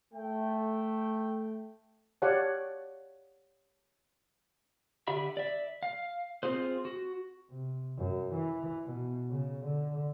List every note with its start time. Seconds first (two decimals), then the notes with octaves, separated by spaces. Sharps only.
0.13 A3 G5
2.22 G4 C#5 D5 F5 F#5 A5
5.08 D3 G4 E5 B5
5.37 D5 E5
5.83 F5
6.43 C4 F4 G#4 C5
6.85 F#4
7.50 C3
7.98 F#2
8.34 E3
8.86 B2
9.31 C#3
9.65 D3